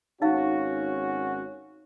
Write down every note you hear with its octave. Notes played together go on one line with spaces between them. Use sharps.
G#1 C#4 D#4 F#4 F5